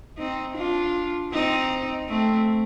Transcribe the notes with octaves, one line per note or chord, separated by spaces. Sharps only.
C4 D#4
D4 F4
C4 D#4
A3 C4